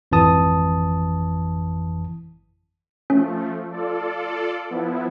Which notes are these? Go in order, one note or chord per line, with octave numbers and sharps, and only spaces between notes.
G#1 F2 E3 A5 D#6
F3 A3 C#4
F4 A4 D5
F3 B3 E4